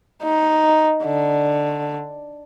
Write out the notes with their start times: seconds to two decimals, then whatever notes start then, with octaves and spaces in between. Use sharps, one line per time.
0.23 D#4
1.03 D3